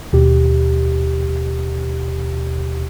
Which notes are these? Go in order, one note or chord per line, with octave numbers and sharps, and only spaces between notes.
D#2 B2 G4